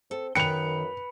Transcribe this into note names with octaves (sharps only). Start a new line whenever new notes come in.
C4 A4
F#2 D#3 B4 G5 B5 C#7 F7